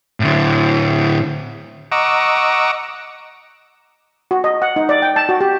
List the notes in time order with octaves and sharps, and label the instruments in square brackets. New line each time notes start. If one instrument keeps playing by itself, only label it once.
[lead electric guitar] A2 D3
[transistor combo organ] D#5 F#5 A#5 C#6 D6 E6
[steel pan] F#4
D#5
F#5
D#4
D5
G5
A5
F#4
G4